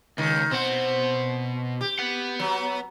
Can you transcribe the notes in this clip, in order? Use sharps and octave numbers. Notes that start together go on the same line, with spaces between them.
C#2 D#3
B2 C4 F#5
G4
B4 F#5
F#3